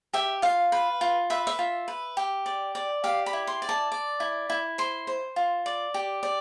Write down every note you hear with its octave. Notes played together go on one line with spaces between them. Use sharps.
G4 E5
F4 F5
B4
F4
B4 E5
E5
F4
B4
G4
D5
D5
G4 F5
B5
E4
C6
D5
A5
D5
E4
E4
C5 C6
C5
F4
D5
G4
D5